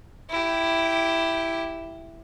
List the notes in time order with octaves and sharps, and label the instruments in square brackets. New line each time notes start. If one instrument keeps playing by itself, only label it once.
[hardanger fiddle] E4 G4